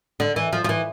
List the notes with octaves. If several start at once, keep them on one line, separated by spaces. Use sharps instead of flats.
D3
E3
F3
F3
E3